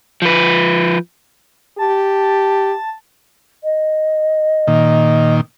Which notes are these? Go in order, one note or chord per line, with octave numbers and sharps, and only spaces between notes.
F3 B4
G4 A5
D#5
A#2 D#3